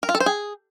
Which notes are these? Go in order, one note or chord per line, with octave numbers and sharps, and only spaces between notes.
A#4
F4
A4
C5
G#4